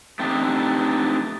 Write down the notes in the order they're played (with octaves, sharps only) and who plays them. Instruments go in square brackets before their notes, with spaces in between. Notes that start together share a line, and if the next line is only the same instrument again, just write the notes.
[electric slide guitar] A3 C4 D4 D#4 G4